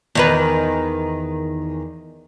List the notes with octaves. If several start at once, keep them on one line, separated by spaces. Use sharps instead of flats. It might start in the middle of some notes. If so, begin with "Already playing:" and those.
E2 D#3 B4